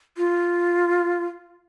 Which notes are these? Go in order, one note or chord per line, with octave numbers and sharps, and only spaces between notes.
F4